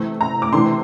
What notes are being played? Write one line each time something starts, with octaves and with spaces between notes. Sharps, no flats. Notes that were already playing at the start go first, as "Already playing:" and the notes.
Already playing: C3 E3 A3
A#5
D6
C3 E3 A3 D4 C6